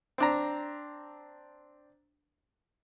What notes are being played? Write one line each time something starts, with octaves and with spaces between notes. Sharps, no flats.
C4 D4 A#5